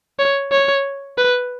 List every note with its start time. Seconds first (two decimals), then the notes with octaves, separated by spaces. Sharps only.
0.19 C#5
0.52 C#5
1.18 B4